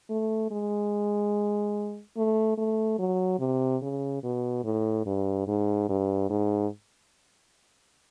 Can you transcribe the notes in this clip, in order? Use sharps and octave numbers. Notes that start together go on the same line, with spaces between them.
A3
G#3
A3
A3
F#3
C3
C#3
B2
A2
G2
G#2
G2
G#2